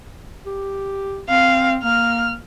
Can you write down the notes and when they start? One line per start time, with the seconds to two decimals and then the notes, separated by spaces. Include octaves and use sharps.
0.46 G4
1.29 C4 F5
1.83 A#3 F6